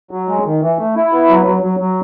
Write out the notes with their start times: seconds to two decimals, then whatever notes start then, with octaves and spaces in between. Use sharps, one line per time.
0.11 F#3
0.29 G#3
0.45 D#3
0.62 E3
0.79 A3
0.96 E4
1.12 B3
1.29 F#3
1.46 F#3
1.63 F#3
1.80 F#3